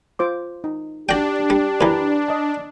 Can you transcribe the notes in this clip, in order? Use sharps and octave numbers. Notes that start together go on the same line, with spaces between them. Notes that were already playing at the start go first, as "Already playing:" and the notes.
F4 C5 D6
D#4
D4 F#4 G4 G5
G3
F#2 E3 B4 A#5
D#5 A5